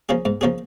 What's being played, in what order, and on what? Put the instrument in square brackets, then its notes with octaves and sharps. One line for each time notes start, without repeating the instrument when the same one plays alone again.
[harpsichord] F3 A#3 C#4 G#4
G#2
F3 A#3 C#4 G#4